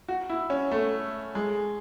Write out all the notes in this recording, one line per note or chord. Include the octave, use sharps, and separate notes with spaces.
F#4
E4
C#4
A3
G#3